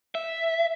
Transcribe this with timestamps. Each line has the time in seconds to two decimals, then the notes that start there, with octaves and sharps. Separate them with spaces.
0.15 E5